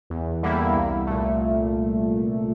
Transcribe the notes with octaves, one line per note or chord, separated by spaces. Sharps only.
E2
D3 G3 A#3 E4
C2
A#2 A3